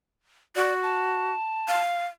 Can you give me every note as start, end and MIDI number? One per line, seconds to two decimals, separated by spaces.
0.56 1.32 66
0.56 0.73 74
0.83 1.81 81
1.68 2.06 77